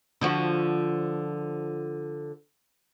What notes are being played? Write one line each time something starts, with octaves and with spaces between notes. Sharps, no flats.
D3 F3 F#4